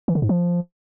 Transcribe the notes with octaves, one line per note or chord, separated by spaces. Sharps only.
E3
D3
G#2
F3